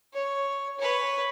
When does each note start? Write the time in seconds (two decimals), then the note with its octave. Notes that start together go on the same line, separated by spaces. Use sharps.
0.13 C#5
0.79 B4 C#5